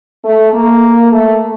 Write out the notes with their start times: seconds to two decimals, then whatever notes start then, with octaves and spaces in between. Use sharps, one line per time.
0.25 A3
0.53 A#3
1.12 A3